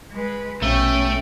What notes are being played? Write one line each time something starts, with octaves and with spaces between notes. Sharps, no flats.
G#3 B4
A#1 B2 A3 C#4 G5